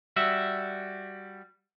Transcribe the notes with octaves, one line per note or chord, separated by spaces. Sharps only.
G3 F#4 E5